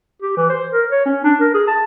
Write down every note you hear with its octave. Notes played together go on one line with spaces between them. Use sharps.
G4
E3
C5
A#4
C#5
C#4
D4
A#4
G#4
A5